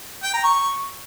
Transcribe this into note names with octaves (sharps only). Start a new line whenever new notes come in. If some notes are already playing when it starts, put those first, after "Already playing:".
G5
A#5
C#6